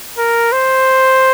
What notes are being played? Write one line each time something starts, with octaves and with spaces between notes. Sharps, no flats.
A#4
C5